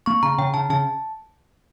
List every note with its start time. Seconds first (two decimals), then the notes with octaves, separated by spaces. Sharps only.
0.06 A#3 C#6
0.23 C#3 A#5
0.38 C#3 G5
0.54 C#3 A5
0.70 C#3 A5